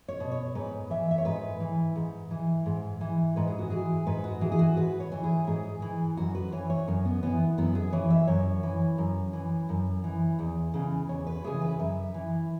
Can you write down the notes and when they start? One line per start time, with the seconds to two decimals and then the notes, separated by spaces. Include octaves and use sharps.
0.08 C#5
0.20 B2
0.32 C#5
0.55 G#2 B4
0.90 E3 E5
1.11 E5
1.18 C#5
1.25 G#2 B4
1.60 E3
1.96 G#2
2.31 E3
2.66 G#2
3.01 E3
3.36 G#2 B4
3.47 G#4
3.59 F#4
3.70 E3 G#4
4.07 G#2 B4
4.24 F#4
4.41 E3 G#4
4.52 G#4
4.59 F#4
4.77 G#2 B4
5.00 C#5
5.12 E3
5.23 G#4
5.47 G#2 G#4
5.82 E3
6.17 F#2 F#4
6.35 B4
6.52 E3 C#5
6.70 C#5
6.87 F#2 C#4
7.05 B3
7.23 E3 B3
7.58 F#2 B3
7.75 G#4
7.92 E3 C#5
8.10 E5
8.27 F#2 C#5
8.63 E3
8.98 F#2
9.33 E3
9.69 F#2
10.04 E3
10.39 E2
10.74 C#3 E3
11.09 E2 C#5
11.27 B4
11.44 C#3 E3 G#4
11.62 B4
11.79 F#2 E5
12.14 E3